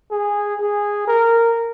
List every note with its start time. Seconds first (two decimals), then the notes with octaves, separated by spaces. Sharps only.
0.11 G#4
0.60 G#4
1.07 A#4